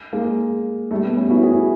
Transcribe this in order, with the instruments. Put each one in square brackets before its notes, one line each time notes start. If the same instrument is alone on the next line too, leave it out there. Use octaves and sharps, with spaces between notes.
[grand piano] G#3 A#3
G3 A3
A3 B3
B3 C#4
E4 F#4
F#4 G#4